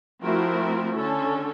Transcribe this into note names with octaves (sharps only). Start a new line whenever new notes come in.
F3 A3 C4 E4 F#4 A#4
D3 C#4 A4